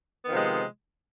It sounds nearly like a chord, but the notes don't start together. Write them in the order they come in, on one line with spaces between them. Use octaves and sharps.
B3 D#3 F3 C3 G#3